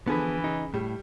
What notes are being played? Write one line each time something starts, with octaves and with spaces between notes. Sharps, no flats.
D3 E3 F3 B3 G#4 B4
C#3 D#4
A2 G3